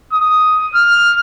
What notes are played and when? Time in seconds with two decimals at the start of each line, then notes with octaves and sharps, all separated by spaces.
0.13 D#6
0.75 F6